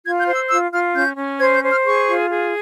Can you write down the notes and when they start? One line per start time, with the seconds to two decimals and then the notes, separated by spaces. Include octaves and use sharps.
0.05 F4 G#6
0.20 G6
0.27 C5
0.35 E6
0.50 F4 E6
0.72 F4 F6
0.94 C#4 G6
1.17 C#4
1.39 C5 G#6
1.55 G6
1.63 C5
1.70 F6
1.85 G#4 C#6
2.07 F4
2.30 G#4